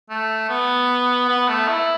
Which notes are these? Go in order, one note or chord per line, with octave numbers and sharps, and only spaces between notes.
A3
B3
B3
A3
E4